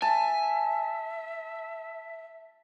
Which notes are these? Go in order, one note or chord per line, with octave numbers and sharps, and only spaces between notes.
E5 G#5 A5